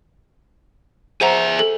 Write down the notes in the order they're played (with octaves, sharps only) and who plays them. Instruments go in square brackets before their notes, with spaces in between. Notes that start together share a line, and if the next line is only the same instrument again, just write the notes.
[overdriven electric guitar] G#4 E5 [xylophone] C5 F#5 A#5
[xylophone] A4